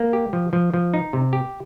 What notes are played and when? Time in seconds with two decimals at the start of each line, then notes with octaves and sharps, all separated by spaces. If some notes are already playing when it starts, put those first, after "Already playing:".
Already playing: A#3
0.13 G4
0.33 F3
0.53 F3
0.74 F3
0.94 D#4
1.13 C3
1.33 G4